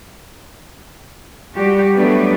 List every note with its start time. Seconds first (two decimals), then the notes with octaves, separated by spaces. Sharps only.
1.55 G3 F#4 G4
1.94 F#3 G3 A3 B3 D4 B4